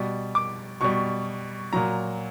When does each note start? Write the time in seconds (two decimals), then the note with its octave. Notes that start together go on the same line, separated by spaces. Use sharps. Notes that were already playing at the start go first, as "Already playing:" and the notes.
Already playing: B2 G3
0.35 D6
0.81 B2 G3 C#6
1.73 A#2 F#3 A#5